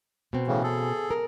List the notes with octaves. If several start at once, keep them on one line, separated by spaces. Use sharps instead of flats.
B2 C4
A2 C#3 E3
G#4 A4
A#4